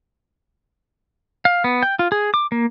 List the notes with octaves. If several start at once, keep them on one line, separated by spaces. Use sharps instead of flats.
F5
B3
G5
F4
G#4
D6
A#3